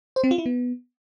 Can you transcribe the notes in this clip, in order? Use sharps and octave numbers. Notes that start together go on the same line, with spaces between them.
C5
C4
F4
E4
B3